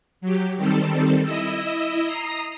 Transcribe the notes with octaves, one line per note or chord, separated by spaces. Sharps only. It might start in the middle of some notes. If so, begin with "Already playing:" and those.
F#3 G4
D#3 G3 C4 A4
E4 D#5 E6
A#5 D#6 C7